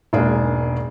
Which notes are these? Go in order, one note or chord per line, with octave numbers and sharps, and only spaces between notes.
E1 G#2 A#3 D4 G#4